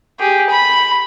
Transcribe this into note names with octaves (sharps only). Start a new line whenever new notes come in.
G4 G#4
B5